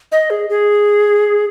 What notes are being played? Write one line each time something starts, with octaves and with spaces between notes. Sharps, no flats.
D#5
G#4
G#4